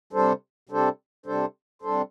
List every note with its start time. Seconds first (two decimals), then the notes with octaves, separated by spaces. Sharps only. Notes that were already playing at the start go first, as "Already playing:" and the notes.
0.13 C3 G3 D4 A4 C5
0.69 C3 G3 D4 A4 C5
1.26 C3 G3 D4 A4 C5
1.82 C3 G3 D4 A4 C5